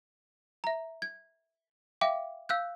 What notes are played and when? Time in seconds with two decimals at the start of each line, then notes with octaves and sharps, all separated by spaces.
0.64 E5 A#5
1.02 G#6
2.01 E5 F5 G5 D6
2.49 F5 E6 F#6 G6